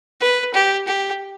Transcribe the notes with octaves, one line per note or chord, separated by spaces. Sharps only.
B4
G4
G4